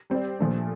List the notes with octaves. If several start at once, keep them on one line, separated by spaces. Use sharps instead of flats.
G3 C4 G4 D5
A#2 F3 A3 D4